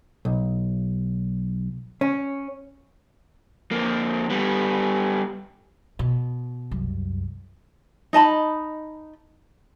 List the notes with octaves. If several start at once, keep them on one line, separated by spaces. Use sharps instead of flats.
B1
C#4
F2 A#3
G3 B3
B2
C2 F#2
D#4 D#5 A5 B5